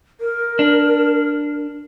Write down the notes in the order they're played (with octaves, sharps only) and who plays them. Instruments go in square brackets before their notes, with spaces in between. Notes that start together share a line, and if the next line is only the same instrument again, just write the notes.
[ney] A#4
[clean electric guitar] D4